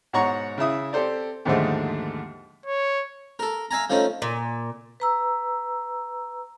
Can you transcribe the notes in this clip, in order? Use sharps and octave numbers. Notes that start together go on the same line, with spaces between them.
G#2 B2 C#5 F#5 A#5 C#6
C#3 E4 E5 D#6
C4 G4 A4 C5 D5
D#2 G#2 D3 F3 G#3 A3
C#5
A4 A#4
E5 F5 G#5 A#5
F3 A3 C#4 D#4
A#2
B4 A#5 E6